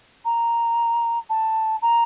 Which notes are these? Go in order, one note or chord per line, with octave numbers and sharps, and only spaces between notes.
A#5
A5
A#5